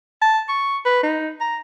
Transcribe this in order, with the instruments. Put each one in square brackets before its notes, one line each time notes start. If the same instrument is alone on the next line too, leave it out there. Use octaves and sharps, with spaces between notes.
[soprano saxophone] A5
C#6
B4
D#4
A#5